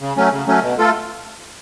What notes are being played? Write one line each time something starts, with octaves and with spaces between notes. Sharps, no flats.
C#3
F#3 A3 C#4
C#3
F#3 A3 C#4
B2
A3 F4 A4